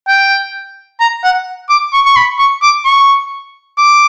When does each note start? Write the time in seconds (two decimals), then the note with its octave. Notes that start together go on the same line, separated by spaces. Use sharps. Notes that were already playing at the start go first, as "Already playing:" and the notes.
0.08 G5
1.00 A#5
1.24 F#5
1.70 D6
1.93 C#6
2.06 C#6
2.16 B5
2.39 C#6
2.62 D6
2.85 C#6
3.78 D6